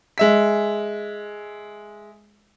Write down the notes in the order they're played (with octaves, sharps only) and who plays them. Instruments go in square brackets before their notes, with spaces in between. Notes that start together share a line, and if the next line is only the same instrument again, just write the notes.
[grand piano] G#3 E5 B6